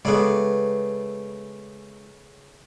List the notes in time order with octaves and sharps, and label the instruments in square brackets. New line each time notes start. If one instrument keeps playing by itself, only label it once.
[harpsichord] C#3 A3 [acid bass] G#3 [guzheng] B3 D5